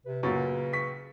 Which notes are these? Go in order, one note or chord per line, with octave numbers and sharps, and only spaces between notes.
C3 B4
F#2 A#2 C#3 B4 C#6 A6
C#6 B6